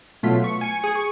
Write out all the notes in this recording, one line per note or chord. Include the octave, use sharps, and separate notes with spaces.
B2 F#3 A3 F4 B6
C#6
G#5 C#7
G#4
C#6